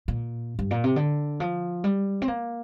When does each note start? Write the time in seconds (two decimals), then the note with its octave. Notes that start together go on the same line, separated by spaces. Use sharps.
0.08 A#2
0.59 G2
0.71 A#2
0.84 C3
0.96 D3
1.40 F3
1.84 G3
2.22 C4
2.28 A#3